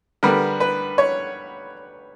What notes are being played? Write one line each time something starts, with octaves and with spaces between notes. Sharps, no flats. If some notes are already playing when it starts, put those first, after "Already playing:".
D3 G3 B3 A#4
B4
C#5